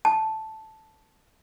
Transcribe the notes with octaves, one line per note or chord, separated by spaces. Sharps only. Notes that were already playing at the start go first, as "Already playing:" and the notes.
A5